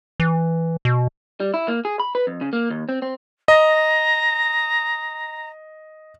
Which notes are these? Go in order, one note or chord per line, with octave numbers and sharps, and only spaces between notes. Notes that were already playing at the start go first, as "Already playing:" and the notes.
E3
B2
G3
E4
A#3
G#4
B5
B4
F2
C#3
A#3
D#2
C4
C4
D#5 A#5